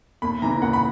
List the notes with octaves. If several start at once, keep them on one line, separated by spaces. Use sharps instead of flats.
D#2 B5
C#3 E3 A#5
D#2 F#5
B5